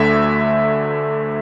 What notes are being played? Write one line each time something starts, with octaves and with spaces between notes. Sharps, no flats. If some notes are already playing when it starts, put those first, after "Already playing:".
Already playing: D2 D3 A3 E5